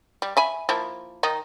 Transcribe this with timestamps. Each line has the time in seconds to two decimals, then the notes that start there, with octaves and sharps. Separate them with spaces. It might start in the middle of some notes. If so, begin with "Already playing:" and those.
0.22 G3
0.37 E5 G#5 B5
0.69 F3 A#3 E4
1.23 D#3 D#4